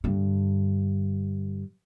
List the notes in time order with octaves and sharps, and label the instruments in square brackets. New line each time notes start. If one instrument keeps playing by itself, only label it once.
[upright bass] G2 D3